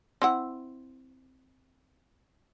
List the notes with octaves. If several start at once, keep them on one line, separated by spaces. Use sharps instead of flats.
C4 E4 F#5